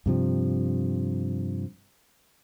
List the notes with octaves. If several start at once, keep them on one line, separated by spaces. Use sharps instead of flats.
G2 C3 F3